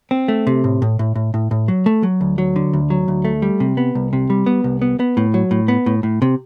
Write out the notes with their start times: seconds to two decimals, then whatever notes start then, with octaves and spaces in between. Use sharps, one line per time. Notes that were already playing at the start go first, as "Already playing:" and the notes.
0.11 C4
0.28 A3
0.47 C3
0.64 A2
0.82 A2
0.99 A2
1.15 A2
1.34 A2
1.51 A2
1.68 F#3
1.86 A3
2.03 F#3
2.21 D2
2.38 F#3
2.56 D3
2.73 D2
2.90 F#3
3.08 D2
3.25 A3
3.42 G3
3.60 C3
3.77 B3
3.95 C2
4.13 C3
4.30 G3
4.46 B3
4.64 C2
4.82 B3
5.00 B3
5.17 A2
5.34 F#3
5.51 A2
5.68 B3
5.86 A2
6.03 A2
6.22 C3